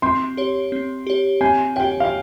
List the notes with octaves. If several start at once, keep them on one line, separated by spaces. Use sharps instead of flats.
C4 C6
G4 C#5
C4
G4 C#5
C4 G#5
G4 C#5 G5
F5